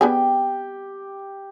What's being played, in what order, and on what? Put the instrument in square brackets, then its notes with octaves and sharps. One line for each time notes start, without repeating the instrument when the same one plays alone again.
[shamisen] B3 D4 G#4 [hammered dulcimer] G4